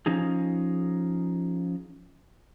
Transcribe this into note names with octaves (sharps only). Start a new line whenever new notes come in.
F3 C#4 D#4 G#4